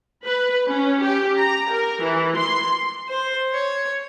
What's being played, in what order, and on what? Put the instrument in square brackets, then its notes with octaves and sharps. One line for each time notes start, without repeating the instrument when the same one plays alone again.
[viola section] B4
C#4
G4
A#5
A#4
E3
C6
[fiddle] C5
C#5